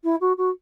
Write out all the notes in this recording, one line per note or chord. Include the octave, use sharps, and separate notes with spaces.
E4
F#4
F#4